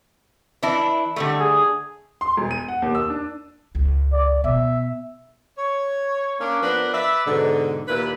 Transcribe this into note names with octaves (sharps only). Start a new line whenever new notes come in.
E3 D4 E4
D3 G3 A3
G#4
C6
E1
D#7
F#5
D#2
E6
D4
C#2
D5
B2 E5
C#5
A#3 C#4 D4
F3 B3 D4 A#4 B4
B4 D5 E5
G#2 B2 D3
D#2 A#2 E4 B4